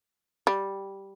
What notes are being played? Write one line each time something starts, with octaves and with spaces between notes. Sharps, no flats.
G3